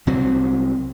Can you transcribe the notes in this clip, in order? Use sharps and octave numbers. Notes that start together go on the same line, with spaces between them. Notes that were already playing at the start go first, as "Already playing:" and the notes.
C2 F#3 C4